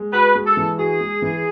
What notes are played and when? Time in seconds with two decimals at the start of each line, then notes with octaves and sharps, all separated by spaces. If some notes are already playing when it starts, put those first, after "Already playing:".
Already playing: G#3
0.13 F#4 B4
0.35 G#3
0.46 A4
0.57 E3
0.78 F#4 G#4
1.00 G#3
1.22 E3